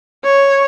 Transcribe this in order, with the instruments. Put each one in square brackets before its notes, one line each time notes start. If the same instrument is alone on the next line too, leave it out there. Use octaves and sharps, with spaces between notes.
[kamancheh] C#5